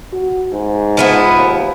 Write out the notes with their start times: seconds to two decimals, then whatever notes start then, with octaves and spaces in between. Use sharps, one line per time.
0.13 F#4
0.52 G#2
0.97 F3 B3 E4
1.37 D#2